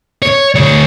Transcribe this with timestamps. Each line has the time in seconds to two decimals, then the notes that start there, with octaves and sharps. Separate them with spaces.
0.22 C#5
0.55 D2 C#5